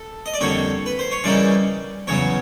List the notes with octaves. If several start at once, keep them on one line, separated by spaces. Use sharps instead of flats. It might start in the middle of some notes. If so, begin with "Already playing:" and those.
Already playing: A4
D#5
D5
F2 D3 G3 A#3 C#5
B4
C5
C#5
C#3 E3 G3 A#3 D#4 D5
E2 C#3 F#3 C#5